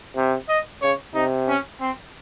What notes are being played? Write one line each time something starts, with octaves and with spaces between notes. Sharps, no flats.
C3
D#5
C#3 C#5
C3 D#4
C#4
C4